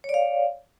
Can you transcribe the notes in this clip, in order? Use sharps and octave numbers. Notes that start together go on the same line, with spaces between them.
C#5 D5 F5